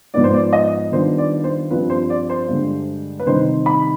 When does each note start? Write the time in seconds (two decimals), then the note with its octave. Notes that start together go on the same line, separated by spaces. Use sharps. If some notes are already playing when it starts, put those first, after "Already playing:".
0.14 G#2 F3 G#3 B3 D#4 D5
0.24 C5
0.34 D5
0.53 D#5
0.92 D#3 G3 B3 D4 F4 C5
1.18 D5
1.44 C5
1.70 G2 F3 C4 F4 B4
1.90 C5
2.10 D5
2.30 C5
2.48 G2 D3 G#3
3.20 B4
3.27 C3 D#3 G3 C4 D#4 C5
3.66 B5